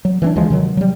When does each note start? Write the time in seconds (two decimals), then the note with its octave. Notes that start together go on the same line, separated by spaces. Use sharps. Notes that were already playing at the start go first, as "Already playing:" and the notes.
0.05 F#3
0.22 E3 C4 D4
0.36 D2 E3 F3 G#3
0.50 C3 D#3 F#3
0.77 F#3 G3